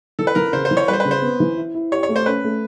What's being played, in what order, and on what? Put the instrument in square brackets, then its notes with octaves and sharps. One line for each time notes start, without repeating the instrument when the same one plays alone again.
[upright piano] E3 [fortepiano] A4
[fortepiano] B4
[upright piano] E3 [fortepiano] A#4
[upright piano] C#3 [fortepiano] C5
[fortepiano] C5
[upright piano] E3
[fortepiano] C#5
[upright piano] G3 [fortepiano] B4
[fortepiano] C5
B4
[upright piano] C#3
[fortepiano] C5
[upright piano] B3
E3
E4
E4
[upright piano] G4 [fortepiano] C#5
[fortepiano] C#5
[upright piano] A3
[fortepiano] C5
[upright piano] C#4 [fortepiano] B4
[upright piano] A3